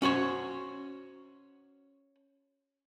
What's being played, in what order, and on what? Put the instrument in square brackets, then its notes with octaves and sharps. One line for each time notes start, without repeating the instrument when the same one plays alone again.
[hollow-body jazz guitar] C#4 F#4 C5 C#5